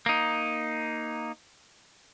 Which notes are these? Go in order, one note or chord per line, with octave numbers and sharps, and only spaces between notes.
A#3 D#4